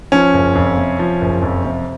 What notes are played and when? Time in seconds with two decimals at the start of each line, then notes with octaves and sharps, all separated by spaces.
0.12 F3 C#4
0.33 F#1
0.55 F2
0.77 C3
0.99 F3
1.21 F#1
1.42 F2
1.64 C3